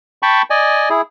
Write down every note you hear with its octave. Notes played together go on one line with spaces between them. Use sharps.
G5 A5 B5 C#6
D5 D#5 G#5
E4 G#4